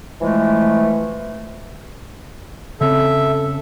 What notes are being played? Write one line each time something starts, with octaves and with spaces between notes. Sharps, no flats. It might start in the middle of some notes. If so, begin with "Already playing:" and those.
E3 F3 G#3 A3
C#3 C4 A4 E5